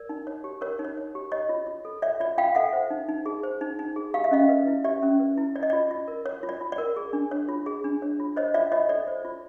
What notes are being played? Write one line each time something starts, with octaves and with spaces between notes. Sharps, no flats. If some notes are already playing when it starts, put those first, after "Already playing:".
Already playing: A#4 D5
D#4
C#5
G4
A#4 C#5
D#4
C#5
C#5
G4
C#5 D#5
F4
F4
A4
C#5 D5 E5
F4 D5
F4 F5 G5
A4 E5 F#5
C5
D#4
D#4
G#4
C5
D#4
D#4
G#4
G4 F5
E5
C#4 D#5 F5
B4
E4
G4 D5 E5
C#4
B4
E4
C#5 D5
D#5
F4 D5
F4
A#4
C#5
F4
D5
F4
D5
A#4
G#4
D4
C#5
F4
G#4
D4
C#5
F4
C5 C#5 D#5
F4 D5 E5
F4 C#5 D#5
A4 D5
C5
F4